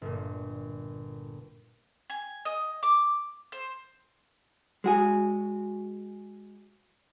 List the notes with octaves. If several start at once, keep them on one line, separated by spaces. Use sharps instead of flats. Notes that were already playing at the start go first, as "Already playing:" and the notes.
G1 A#2
G#5
D#5
D6
C5
G#3 F#4 G#4